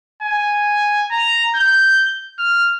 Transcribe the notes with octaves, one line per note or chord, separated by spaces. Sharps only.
G#5
A#5
G6
F6